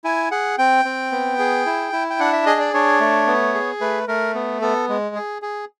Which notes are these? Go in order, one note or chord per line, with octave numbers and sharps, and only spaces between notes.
E4 G#5
G#4 F#5
C4 G5
C4
B3
G#4
E4
E4
G5
D4 F#5
E5
G#4 D#5
D5
D4 C#5
A3
B3
G#4
A3 B4
A3 A#4
B3
B3 A4
G#3
G#4
G#4